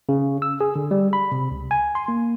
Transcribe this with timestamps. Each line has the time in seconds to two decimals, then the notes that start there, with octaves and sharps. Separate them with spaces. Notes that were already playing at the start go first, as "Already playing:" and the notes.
0.09 C#3
0.42 E6
0.61 G#4
0.76 D3
0.91 G3
1.13 B5
1.32 C3
1.51 C#2
1.71 G#5
1.95 C6
2.08 A#3